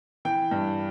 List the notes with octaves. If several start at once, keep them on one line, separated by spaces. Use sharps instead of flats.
E3 G5
G2